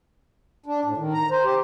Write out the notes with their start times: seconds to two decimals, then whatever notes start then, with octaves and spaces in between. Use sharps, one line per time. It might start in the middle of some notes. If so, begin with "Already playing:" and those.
0.66 D4
0.85 A2
0.97 D#3
1.13 A#5
1.31 C5
1.44 G4